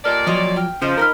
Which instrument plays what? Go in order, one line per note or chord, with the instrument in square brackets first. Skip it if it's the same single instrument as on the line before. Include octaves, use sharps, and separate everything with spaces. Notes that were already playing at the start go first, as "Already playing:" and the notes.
[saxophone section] A#2 G3 D5 [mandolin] A4 A#4 D#5
[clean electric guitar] F3 F#3 [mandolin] F4 C#5 D#5
[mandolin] G5 F6
[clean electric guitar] C#3 [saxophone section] F3 [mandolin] F4 C5 D#5
[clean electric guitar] D#4 A#4 [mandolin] D#5 B5 F6